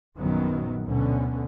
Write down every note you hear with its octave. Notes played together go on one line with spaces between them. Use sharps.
A#1 F#2 D#3 F#3 B3
D2 B2 D3 B3 C#4